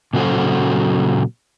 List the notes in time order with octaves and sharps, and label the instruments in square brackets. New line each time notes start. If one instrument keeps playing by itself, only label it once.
[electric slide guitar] A#2 C#3 F#3 F#4 A4 C5